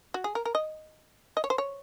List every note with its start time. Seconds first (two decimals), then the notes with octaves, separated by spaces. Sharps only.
0.14 F#4
0.24 G#4
0.35 A#4
0.45 A#4
0.55 D#5
1.37 D#5
1.44 C#5
1.50 C5
1.58 C#5